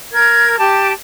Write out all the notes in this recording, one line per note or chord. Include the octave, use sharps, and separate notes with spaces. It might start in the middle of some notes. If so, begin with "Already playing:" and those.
A#4 G#6
G4 A5